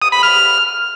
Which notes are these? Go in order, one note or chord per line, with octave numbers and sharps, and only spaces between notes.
D#6
B5
F6